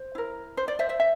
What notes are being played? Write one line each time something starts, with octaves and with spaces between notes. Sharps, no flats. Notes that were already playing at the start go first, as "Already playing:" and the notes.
Already playing: C5
E4 A#4
C5
D5
C5 E5
C5 E5
E5